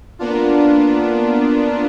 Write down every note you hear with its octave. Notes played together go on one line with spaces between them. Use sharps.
A#3 B3 D4 F4